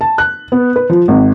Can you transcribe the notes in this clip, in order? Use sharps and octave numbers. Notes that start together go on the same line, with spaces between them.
A5
F#6
B3
B4
F3
G#1